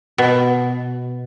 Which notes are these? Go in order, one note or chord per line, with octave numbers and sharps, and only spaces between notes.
B2